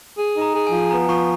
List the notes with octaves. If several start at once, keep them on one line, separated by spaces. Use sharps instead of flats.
G#4
D#4
A#5
G#4
F3 G#5
B3 A#5
F3 C#6